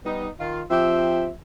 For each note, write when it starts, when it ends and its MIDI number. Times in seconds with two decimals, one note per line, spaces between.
0.05 0.28 55
0.05 0.28 59
0.05 0.28 63
0.39 0.62 51
0.39 0.62 65
0.70 1.29 53
0.70 1.29 60
0.70 1.29 67
0.70 1.29 76